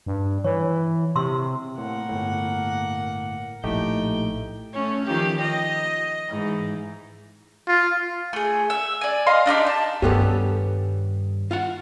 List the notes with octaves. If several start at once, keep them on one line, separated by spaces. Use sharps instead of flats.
G2
E3 C#5
C3 C6 E6
A2 A#3 F#5
G1 A2
A#1 A2 A3 D#4 G4 G5
A3 C#4
D#3 F3 G4
D#5
G#2 E3
F4
A3 G#4
E5 E6
D5 G#5
D#5 F5 C6
D4 D#4 F4 G4
A5
G2 D#3 G3 B3 C#4 G4 A4
F4 F5 F#5